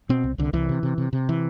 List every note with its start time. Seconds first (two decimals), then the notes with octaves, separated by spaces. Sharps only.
0.09 B2 C4
0.24 C2
0.38 C2 D3
0.53 C2 E3
0.69 C3
0.83 C3
0.98 C3
1.13 C3
1.29 E3